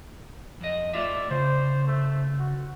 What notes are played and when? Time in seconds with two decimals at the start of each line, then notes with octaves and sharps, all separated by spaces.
0.61 F2 D#5
0.94 A3 F4 D5 E5
1.30 C#3 C5
1.87 A3
2.39 F#4